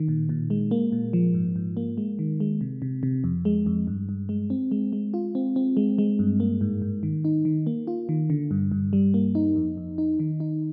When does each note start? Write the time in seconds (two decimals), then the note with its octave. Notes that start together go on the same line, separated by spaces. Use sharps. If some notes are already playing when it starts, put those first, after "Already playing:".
Already playing: D#3
0.08 A#2
0.29 A#2
0.50 G#3
0.71 A#3
0.92 A#2
1.13 F3
1.34 G#2
1.56 G#2
1.77 A#3
1.98 G#3
2.19 D#3
2.40 G#3
2.61 C3
2.82 C3
3.03 C3
3.24 F2
3.45 G#3
3.66 F2
3.87 G2
4.09 G2
4.29 G#3
4.50 C4
4.71 G#3
4.93 G#3
5.14 F4
5.35 C4
5.56 C4
5.77 G#3
5.98 G#3
6.19 G2
6.40 A#3
6.61 G#2
6.82 G#2
7.03 D#3
7.25 D#4
7.45 D#3
7.67 A#3
7.87 F4
8.09 D#3
8.30 D3
8.51 G2
8.72 G2
8.93 G3
9.14 A#3
9.35 D#4
9.56 F2
9.77 F2
9.98 D#4
10.20 D#3
10.40 D#4